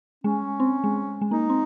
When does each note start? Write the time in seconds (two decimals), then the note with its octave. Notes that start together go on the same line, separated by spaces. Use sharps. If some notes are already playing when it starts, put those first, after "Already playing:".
0.24 G#3 C#4
0.60 C4
0.84 G#3
1.21 G#3
1.31 A#3 D#4
1.50 C4